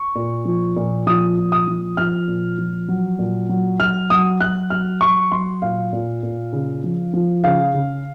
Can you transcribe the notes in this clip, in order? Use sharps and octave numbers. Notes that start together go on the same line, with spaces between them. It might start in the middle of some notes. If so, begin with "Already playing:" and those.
Already playing: C#6
A#2
F3
A#2
F3 D#6
A#2
D#6
F3
F3 F6
A#2
F3
F#3
A#2
F#3
F#3 F6
F#3 D#6
F#3 F#6
F#3 F6
F#3 C#6
F#3 C6
A#2 F5
A#2
A#2
C#3
F3
F3
C#3 F5
C#3